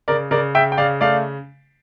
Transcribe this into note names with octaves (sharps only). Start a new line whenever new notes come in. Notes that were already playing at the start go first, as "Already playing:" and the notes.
C#3 A#4 D5
C#3 A#4 D5
C#3 E5 G5
G5
C#3 D5 F5
A3 D5 F5